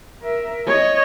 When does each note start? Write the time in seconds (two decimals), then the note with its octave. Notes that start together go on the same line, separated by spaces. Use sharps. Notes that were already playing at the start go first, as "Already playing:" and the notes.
0.22 A#4 E5
0.67 C#5 D#5